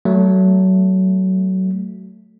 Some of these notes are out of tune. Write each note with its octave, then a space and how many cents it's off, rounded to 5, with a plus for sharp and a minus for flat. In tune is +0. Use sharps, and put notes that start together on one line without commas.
F#3 +25 A3 +0